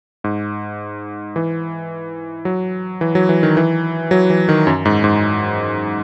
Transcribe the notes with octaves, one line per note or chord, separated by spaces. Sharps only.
G#2
E3
F#3
E3
F#3
E3
D#3
E3
F#3
E3
D#3
F#2
G#2
G#2